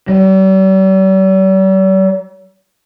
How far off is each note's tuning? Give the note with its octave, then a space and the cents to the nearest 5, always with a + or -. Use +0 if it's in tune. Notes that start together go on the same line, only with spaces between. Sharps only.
G3 -45